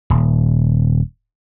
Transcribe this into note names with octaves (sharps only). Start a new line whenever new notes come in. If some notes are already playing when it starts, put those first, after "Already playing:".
D#1